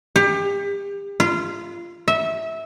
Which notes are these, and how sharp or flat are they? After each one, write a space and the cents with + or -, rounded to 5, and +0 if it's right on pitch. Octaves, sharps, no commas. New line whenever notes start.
G4 +30
F4 -20
E5 -20